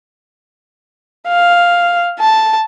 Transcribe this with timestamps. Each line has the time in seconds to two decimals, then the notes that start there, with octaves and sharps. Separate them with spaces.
1.27 F5
2.19 A5